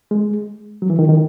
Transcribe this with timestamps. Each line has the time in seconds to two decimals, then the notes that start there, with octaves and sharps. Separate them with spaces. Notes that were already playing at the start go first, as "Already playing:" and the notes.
0.11 G#3
0.82 F#3
0.90 E3
0.99 D#3
1.09 D#3